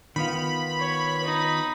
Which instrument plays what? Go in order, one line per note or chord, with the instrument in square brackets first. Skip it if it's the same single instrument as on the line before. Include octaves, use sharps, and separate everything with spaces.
[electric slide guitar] D#3 B3 F4 [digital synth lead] B5
[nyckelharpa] C#5
D#4